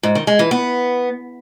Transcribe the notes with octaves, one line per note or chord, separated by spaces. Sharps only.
G#2
D#3
G#3
E3
B3